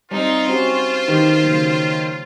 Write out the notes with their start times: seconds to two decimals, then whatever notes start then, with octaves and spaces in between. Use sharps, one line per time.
0.11 G3 C4 D#4 F4
0.48 C#4 F#4 G4 C5
1.08 D#3 E3 G4
1.44 C#3 F#3 A#3